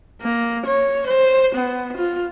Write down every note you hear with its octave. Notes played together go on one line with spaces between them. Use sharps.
A#3
C#5
C5
B3
F4